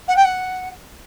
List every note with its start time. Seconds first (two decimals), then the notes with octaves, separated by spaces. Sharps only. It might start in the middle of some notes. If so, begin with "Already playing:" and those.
0.08 F#5
0.16 G5
0.25 F#5